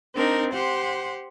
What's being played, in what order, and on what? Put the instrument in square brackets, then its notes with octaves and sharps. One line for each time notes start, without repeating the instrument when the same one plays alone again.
[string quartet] C4 D4 D#4 A#4
G4 C5 F#5 C6